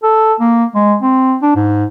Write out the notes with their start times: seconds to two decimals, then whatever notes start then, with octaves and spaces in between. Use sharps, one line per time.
0.03 A4
0.40 A#3
0.75 G#3
1.02 C4
1.42 D4
1.56 G#2